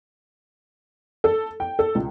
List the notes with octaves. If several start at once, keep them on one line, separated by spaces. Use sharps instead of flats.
A4
G5
A4
C#2